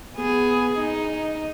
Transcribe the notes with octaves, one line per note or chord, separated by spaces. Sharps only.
B3 G#4
D#4